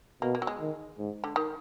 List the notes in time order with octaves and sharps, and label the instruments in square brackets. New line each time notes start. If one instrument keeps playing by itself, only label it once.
[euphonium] B2 [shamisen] A#3
[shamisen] A#3
F#3
G#3
[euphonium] D#3
G#2
[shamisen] D3
D#3